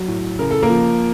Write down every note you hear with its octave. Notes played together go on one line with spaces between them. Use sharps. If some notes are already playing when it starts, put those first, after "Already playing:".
Already playing: F#3
A2
C#3 A#4
A4
A#3 A#4
F3